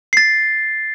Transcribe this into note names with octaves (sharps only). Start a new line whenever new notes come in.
A6 C7